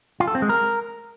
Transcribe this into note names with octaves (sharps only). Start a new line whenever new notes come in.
F4
A4
C4
G#3
A#4